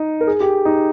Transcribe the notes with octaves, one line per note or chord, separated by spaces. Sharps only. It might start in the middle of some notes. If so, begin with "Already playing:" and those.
Already playing: D#4
A#4
G#4
G4
D#4